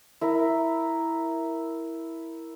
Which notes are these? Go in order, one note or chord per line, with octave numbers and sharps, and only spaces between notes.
E4 A#4